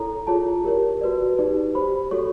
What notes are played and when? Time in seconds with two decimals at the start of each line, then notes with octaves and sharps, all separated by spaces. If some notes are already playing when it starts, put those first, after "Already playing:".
Already playing: E4 A4 C#5 A#5
0.27 F4 G#4 C#5 A5
0.64 G4 A#4 C#5
1.01 F#4 B4 D5
1.38 D#4 G4 B4 D5
1.75 G4 C5 B5
2.11 F#4 A4 C#5 C#6